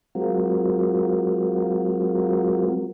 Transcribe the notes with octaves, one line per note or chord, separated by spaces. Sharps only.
F#3 G#3 C4 F4 F#4 A#4